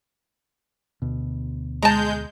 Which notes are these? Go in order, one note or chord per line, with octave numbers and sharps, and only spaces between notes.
D2 B2
G#3 A5 A#5 G6